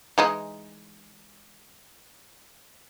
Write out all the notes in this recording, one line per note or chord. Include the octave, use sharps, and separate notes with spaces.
E3 G#3 D#4